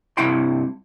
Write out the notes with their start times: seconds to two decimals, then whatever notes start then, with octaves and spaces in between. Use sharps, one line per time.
0.17 G2 C3 E4 G5 C6